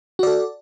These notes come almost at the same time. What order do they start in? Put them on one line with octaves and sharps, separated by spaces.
F#4 D5 A4